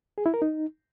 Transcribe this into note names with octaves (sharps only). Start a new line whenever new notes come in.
G#4
E4
A#4
D#4